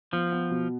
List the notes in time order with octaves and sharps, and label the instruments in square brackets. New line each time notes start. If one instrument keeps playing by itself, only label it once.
[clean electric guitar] F3 [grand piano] B3
[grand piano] B3
B2